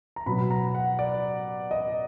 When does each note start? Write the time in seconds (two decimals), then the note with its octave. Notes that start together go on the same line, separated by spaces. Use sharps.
0.16 A#5
0.26 B2 F#3 B3 B5
0.51 A#5
0.75 F#5
0.99 D5
1.71 D#5